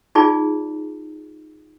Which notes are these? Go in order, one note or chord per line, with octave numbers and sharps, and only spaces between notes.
D#4 F4 G#4 D5 G#5